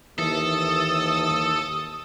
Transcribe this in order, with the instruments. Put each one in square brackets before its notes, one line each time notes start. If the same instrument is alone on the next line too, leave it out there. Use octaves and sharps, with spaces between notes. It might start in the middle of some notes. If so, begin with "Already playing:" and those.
[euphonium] D#2 [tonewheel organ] E3 [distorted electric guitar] A4 [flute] D#6